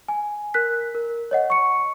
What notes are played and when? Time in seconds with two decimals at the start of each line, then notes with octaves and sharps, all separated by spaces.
0.08 G#5
0.54 A#4 F#6 B6
0.95 A#4
1.31 C#5 D#5 F#5
1.50 C#6 C#7